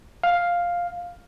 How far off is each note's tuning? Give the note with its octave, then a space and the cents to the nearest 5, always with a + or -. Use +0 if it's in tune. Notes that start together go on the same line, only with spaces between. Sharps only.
F5 +5